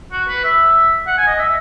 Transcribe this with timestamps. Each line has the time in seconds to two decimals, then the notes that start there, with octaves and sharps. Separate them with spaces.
0.12 F#4
0.28 B4
0.44 E5
1.07 F#5
1.18 G#5
1.27 D#5
1.39 E5